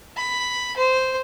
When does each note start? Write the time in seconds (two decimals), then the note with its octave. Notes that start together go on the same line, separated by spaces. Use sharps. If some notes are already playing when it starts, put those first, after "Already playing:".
0.17 B5
0.77 C5